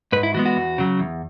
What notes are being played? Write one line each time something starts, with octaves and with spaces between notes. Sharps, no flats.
G#2 B4
E4
E3 G#3 B3 F#4
F#4
E2
C#3 F#3
E2